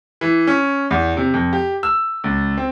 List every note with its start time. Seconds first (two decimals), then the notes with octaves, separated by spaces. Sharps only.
0.21 E3
0.47 C#4
0.91 E2
1.17 C3
1.34 F2
1.53 G4
1.83 E6
2.24 C#2
2.57 C4